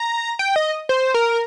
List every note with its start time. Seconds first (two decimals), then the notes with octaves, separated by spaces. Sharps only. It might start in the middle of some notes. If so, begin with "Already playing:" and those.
Already playing: A#5
0.39 G5
0.56 D#5
0.89 C5
1.14 A#4